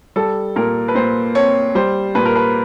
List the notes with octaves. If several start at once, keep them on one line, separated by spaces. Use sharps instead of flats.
G3 A4
A#2 A#4
B4
A#2 C5
C4 C#5
G3 C5
A#2 B4
A#4
B4